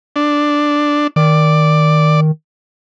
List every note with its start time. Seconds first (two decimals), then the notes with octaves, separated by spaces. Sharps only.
0.16 D4
1.16 D#3 D5